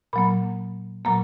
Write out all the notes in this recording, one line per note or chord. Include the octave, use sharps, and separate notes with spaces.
A#2 F#3 A#3 B5
A#2 F#3 A#3 A#5